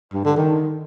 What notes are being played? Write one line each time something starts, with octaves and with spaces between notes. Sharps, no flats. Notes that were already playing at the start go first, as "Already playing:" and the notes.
G2
D3
D#3